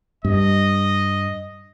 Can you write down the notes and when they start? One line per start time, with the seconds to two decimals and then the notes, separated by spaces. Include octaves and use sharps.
0.25 G2 D#5